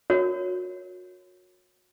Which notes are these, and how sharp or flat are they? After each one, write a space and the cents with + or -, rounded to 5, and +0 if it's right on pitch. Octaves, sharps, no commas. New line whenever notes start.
F#4 -35 A#4 +0 C#5 +0